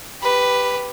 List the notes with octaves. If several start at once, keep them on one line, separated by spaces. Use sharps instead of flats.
G4 B4